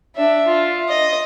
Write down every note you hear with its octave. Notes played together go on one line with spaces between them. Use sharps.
D4 E5
F4
D#5